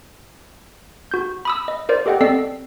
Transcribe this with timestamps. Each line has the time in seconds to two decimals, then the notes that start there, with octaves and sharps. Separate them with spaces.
1.11 F#4 G6
1.45 B5 D#6 E6
1.68 D#5
1.89 A#4 C5 D5
2.06 G4 A4 D#5 F#5 G5
2.21 C4 A4 D5 D#5 E6 C7